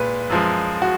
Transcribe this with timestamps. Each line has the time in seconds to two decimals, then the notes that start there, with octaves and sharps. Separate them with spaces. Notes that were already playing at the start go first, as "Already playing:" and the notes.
Already playing: A#2 G#3 B4
0.30 F#2 F3 G#3
0.82 F#4